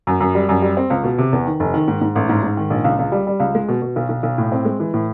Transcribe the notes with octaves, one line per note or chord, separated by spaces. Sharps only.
F#2
F#2
G3
F#2
G3
C4
C#2
B2
C3
E2
D#3
F1
D#3
G#2
G#2
A1
G#2
G#2
D#3
A#1
C#2
C#2
G3
G3
C#2
G#3
B2
B2
B1
B1
B1
A2
C4
G#3
E3
A2